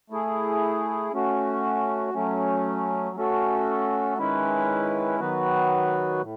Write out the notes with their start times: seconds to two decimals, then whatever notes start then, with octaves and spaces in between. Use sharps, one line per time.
0.10 A3 E4 G#4
1.13 A3 C#4 F#4
2.14 F#3 A3 C#4
3.16 A3 C#4 F#4 A4
4.18 D#3 G#3 C#4 E4 B4
5.19 D#3 F#3 B3 F#4 B4
6.21 A2